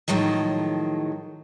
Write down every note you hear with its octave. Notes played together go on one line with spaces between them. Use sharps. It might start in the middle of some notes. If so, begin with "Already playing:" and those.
A2 D#3 F3 F#3 G#3